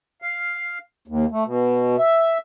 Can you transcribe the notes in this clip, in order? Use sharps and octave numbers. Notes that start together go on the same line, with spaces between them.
F5
D#2
A3
B2
E5